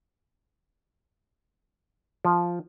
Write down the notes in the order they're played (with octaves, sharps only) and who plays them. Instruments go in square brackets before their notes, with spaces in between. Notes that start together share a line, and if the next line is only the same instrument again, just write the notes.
[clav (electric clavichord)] F3